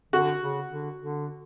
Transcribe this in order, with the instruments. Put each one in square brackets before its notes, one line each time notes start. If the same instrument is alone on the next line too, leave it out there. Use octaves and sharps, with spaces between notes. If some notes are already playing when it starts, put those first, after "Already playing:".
[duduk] D3 [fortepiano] F#4
[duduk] C#3
D3
D3